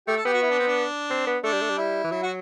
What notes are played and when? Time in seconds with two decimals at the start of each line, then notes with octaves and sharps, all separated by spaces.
0.07 A3 G4
0.16 A4
0.25 B3 G4
0.34 F#4
0.42 E4
0.50 D4
0.59 C4
0.67 D4
1.10 C4
1.27 B3
1.44 A3 D4
1.52 G3
1.61 A3
1.69 G3
1.78 E4
2.04 E3
2.11 F#3 E4
2.23 F#4